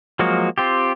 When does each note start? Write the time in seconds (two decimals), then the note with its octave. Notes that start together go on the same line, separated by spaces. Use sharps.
0.19 F3 F#3 G#3 A#3 F#4
0.58 C4 F4 G4